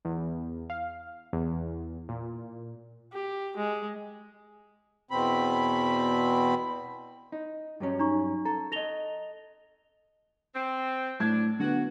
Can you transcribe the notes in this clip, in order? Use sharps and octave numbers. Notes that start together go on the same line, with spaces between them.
E2
F5
E2
A#2
G4
G#3
E2 B2 C4 B5
D#4
G2 F#3 C#4
D#4 A#5 C#6
A4 A#5
A4 D#5 A#6 F7 G7
C4
A2 D4 G#6
D3 B3 F#4